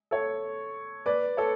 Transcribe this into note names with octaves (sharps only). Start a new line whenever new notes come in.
A4 C#5
B4 D5
A4 C#5